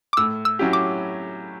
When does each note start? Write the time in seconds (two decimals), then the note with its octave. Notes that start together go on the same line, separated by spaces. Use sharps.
0.13 D6
0.17 A2 E6
0.45 E6
0.59 F#3 C#4 E4 G4
0.73 D6